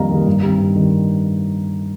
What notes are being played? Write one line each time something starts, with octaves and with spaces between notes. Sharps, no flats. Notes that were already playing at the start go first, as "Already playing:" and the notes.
Already playing: F2 D#3 G3 A#3 D#5 F5 A#5
D#3 G3 A#3
G2
D#3 G3 C4
G2
D#3 G3 C4